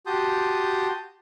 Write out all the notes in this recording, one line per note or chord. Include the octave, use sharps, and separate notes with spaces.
F#4 G4 A5 C6 D#6 G6